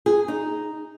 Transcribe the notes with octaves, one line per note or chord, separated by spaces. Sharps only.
G#4
D#4